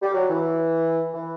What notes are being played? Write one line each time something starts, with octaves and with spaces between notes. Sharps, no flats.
G3
F#3
E3
E3